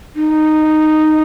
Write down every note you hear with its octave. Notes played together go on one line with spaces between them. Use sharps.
D#4